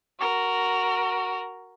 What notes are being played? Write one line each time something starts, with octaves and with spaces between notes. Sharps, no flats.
F#4 A#4